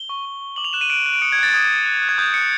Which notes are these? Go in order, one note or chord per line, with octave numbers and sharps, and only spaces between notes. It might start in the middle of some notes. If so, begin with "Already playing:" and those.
Already playing: G7
C#6
C#6
C#6
D6 F#7
F7
F#6 E7
D#7
F#6 D7
F#6
D7
D#6 C#7
G#6
F#6 A6
A6
D#6 G#6
F#6
F#6
F#6
G#6
D#6 G6
F#6 C#7